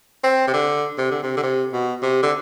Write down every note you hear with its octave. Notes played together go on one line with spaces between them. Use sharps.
C4
C3
D3
C3
D3
C3
D3
C3
B2
C3
D3